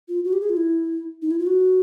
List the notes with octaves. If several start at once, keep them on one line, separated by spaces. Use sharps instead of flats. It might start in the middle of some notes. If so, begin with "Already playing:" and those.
F4
F#4
G4
G#4
F4
E4
D#4
E4
F4
F#4